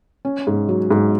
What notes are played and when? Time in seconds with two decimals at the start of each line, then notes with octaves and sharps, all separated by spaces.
0.25 C#4
0.47 G#2
0.69 F#3
0.91 G#2